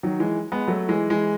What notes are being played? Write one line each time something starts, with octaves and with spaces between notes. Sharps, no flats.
D#3 F#3
E3 G#3
G#3 B3
F#3 A3
E3 G#3
E3 G#3